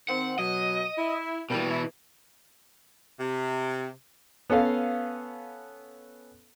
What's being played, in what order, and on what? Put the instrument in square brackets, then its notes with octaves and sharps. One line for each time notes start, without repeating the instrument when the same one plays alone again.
[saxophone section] D#3 C4 [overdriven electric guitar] F#5
[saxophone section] B2 F#3 [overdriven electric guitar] D#5
[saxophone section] E4
[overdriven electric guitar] B2 E3 [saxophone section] G3 A#3
[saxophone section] E4
C3
[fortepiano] B3 C#4 A4 F5